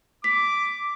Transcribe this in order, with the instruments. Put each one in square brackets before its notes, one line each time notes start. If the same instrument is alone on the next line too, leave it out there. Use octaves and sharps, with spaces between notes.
[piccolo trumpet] D6 [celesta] B6